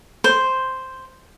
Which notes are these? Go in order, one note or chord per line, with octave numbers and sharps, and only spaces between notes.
C5